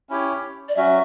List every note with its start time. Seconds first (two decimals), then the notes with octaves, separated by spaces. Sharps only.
0.09 C#4 E4 G4 C#5
0.69 D5
0.76 F#3 C#4 F#4 E5